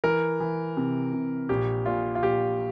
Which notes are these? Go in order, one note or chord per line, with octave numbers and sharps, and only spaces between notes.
E3 A#4
E3
C3
C3
A#1 G4
A#2 F4
F4
A#1 G4